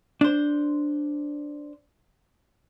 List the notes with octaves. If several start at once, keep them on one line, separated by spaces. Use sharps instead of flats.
D4 C5